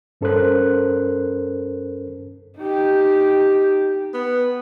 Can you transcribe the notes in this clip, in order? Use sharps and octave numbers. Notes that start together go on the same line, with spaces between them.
G2 C#4 A4 A#4 C5 F#6
D#4 G4
B3